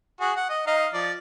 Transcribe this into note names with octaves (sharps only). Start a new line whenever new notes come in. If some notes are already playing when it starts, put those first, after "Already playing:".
F#4 G#4
F#5
D#5
D#4 D#5 F5
F3 D5